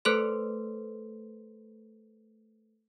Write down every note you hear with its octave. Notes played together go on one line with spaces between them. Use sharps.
A3 A4 B4 C5 C6